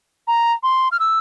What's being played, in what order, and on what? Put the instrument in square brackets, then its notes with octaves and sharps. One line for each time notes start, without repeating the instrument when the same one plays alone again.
[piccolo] A#5
C6
F6
E6